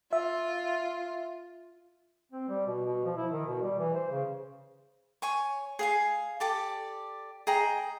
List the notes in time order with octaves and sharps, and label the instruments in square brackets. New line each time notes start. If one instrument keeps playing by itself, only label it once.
[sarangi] F4 [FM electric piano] E5
[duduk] C4
G3
B2
B2
F3
E4
D#3
B2
G3
E3
C5
C#3
[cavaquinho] C#5 G#5 C#6
G#4 F5 G#5
G4 A4 D5
G#4 D#5 G5 A#5